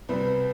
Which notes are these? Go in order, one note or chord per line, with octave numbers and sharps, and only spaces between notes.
C2 B2 G3 B3 C4